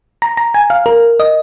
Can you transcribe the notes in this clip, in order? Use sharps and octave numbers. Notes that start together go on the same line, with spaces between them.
A#5
A#5
G#5
F5
A#4
D#5